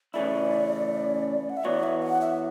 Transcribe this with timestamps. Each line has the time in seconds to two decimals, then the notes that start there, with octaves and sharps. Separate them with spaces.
0.14 C#3 E3 A3 C#4 E4 D5
1.49 F#5
1.57 E5
1.64 E3 B3 F#4 C#5 D5
1.83 E5
2.02 F#5
2.21 E5